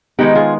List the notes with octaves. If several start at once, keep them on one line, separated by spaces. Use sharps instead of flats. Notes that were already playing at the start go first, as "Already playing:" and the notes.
D#3 G#3 B3 D#4 G4
F4 G#4